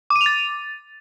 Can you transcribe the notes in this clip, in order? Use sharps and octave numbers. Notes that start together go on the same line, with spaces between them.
D6
D#7
F7
A6